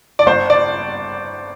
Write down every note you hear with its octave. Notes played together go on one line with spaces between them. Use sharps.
D5
G1 C5
D5